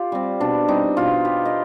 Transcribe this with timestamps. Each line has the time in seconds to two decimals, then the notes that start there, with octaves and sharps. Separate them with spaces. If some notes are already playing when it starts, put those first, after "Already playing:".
Already playing: F4 G4 D5
0.12 G3 C4
0.40 B2 D4
0.68 G3 C4 D#4
0.96 B2 F4
1.25 B3 G4
1.45 D#5